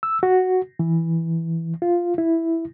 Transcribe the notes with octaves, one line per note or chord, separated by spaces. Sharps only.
E6
F#4
E3
F4
E4